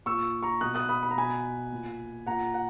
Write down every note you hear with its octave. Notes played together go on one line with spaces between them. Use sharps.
A#2 C#6 E6
A#5 C#6
B2 D#6 F#6
D#6 F#6
B5 D#6
B5
A#5
B2 G#5 B5
A#2
A#2 F#5 A#5
F#5